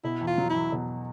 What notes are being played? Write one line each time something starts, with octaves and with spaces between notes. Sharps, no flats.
B2 E4
E2
F4
F#3
E2 E4
B2